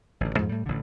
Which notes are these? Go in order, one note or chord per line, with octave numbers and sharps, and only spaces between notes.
A1 D3
F2 G#2 F3 G#3
A2 G3
A1 D3